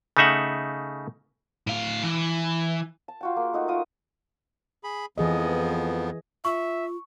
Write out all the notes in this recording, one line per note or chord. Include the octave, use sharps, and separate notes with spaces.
C#3 A3 D#4 E5 F#5
A2 F5
E3
A5
F4 F#4 G5
A#3 G#4
A3 D#4 F#4
D#4 F4 A#4 D#6
G#4 B5
F2 E3 F3 B3 G#4 D#5
F4 E5 C#6